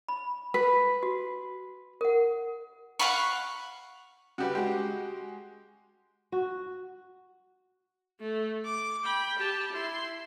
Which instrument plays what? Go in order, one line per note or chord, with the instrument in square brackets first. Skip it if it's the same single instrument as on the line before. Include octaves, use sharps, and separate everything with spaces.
[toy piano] B5
[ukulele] B4
[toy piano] F#4
A#4 F#5
[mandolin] F5 F#5 B5 C#6
[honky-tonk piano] C#3 G3 [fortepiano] F#4 G4 B4
[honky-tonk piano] G#3 F#4 [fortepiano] G4
[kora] F#4
[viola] A3
D6
G5 B5
G4 A5
E4 C6